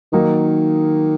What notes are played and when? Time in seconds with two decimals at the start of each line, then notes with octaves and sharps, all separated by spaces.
0.13 D#3 F#3 A#3 D#4